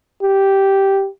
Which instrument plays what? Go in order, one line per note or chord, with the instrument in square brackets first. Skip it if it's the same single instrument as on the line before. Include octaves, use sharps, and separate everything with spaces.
[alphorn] G4